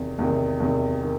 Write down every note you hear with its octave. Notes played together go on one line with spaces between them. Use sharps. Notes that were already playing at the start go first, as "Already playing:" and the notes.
Already playing: E2 C3 D#3
E2 C3 D#3
E2 C3 D#3
D#3